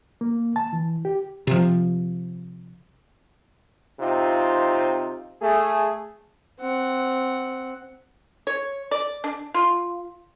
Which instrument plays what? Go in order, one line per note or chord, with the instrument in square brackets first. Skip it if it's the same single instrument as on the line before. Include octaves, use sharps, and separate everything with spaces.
[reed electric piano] A#3
A5
E3
G4
[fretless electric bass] C3 F3
[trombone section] C3 C4 D#4 F4
A3 G#4
[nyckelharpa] C4 F#5
[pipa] C#5
D5
D4
F4